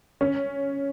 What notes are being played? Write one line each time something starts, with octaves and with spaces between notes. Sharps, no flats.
C#4